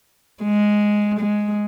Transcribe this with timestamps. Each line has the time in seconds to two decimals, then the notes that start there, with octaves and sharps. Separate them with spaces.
0.44 G#3
1.20 G#3